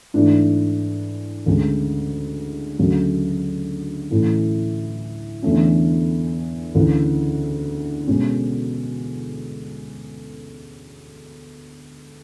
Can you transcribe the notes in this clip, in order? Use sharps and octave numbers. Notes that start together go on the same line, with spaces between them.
G#2 E3 A3 D4
D2 C#3 G#3
D2 C#3 F#3 A3
A2 E3 A3 C#4 E4
E2 D3 A3 C#4
D2 C#3 E3
B2 G#3 C#4